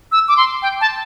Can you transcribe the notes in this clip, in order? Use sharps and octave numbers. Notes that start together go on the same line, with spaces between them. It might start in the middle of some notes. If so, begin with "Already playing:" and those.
E6
D6
C6
G5
A5